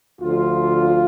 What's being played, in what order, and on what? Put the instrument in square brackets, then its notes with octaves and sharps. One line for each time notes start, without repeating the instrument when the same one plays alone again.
[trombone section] D2 D3 F3 F4